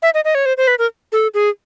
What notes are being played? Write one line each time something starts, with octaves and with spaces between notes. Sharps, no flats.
E5
D#5
D#5
C#5
C5
C5
B4
A#4
A4
G#4